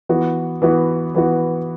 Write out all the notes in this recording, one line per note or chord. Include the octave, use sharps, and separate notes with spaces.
E3 B3 F#4
E3 B3 F#4
E3 B3 F#4